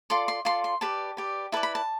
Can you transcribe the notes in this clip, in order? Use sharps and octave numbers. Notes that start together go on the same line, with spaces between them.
F4 A4 D5 C6
C6
F4 A4 D5 C6
C6
G4 B4 D5 A5
G4 B4 D5
E4 B4 D5 A5
B5
A5